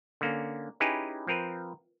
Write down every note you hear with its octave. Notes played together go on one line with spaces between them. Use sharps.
D3 A#3 C#4
C#4 D#4 E4 G4 G#4 B4
F3 C4 A#4 B4